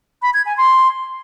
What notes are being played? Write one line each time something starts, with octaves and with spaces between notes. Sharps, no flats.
B5
G#6
G#5
C6